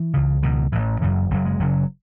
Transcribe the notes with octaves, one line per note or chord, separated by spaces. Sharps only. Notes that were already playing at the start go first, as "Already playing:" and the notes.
Already playing: E3
C#2 C#3
C#2 B2 D#3
A1 A2 E3
F#1 F#2 C#3
F#1 F#2 C#3 F#3
G#3
F#1 F#2 C#3 F#3